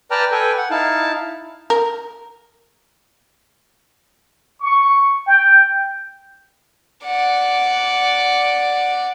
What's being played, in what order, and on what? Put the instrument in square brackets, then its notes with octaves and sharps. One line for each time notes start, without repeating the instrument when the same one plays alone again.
[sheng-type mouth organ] B4 D5 G5 A5 A#5 F6
A4 B4 G5 G#5
F#5
D#4 E4 F5 A5
[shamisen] A#4
[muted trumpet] C#6
G5
[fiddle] D5 F#5